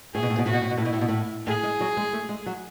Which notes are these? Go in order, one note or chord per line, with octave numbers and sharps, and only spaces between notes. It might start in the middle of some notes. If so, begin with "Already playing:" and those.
A2 G#4
B2
A2
B2
A2 F#4
B2
A2
B2
A2 E4
B2
A2
B2
A2
A2 G#4
G#3
F#3
G#3
A3
G#3
F#3